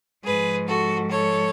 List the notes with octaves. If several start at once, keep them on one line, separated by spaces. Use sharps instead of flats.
G#2 F3 G#4 B4
F#4 A4
A4 C#5